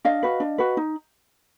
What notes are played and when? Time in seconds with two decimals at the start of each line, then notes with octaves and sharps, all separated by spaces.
0.05 D4 D#5 F5
0.23 F#4 B4
0.40 D4
0.58 F#4 B4
0.77 D#4